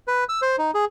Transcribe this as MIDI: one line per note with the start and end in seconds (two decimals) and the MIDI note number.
0.08 0.24 71
0.29 0.41 88
0.42 0.56 72
0.58 0.71 63
0.74 0.85 68